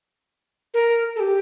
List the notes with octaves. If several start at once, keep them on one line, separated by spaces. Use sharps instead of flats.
A#4
A4
G4